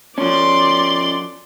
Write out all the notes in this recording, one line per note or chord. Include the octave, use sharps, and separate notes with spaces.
F3 C#4 D5 C6